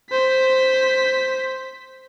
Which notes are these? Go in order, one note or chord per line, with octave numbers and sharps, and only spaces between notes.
C5 B6